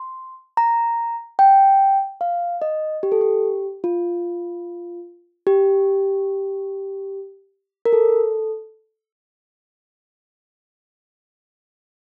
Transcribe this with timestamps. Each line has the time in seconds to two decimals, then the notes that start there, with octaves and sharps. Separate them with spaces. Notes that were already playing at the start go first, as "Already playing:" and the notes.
Already playing: C6
0.57 A#5
1.39 G5
2.21 F5
2.62 D#5
3.03 G4
3.12 A4
3.21 G4
3.84 F4
5.47 G4
7.85 A#4
7.92 A4